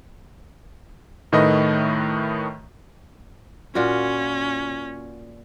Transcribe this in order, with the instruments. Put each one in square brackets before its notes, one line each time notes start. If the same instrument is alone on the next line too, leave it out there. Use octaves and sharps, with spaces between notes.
[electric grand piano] A2 D#3 A3 B4 D#5
[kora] A#2 F4 F#4 [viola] C#4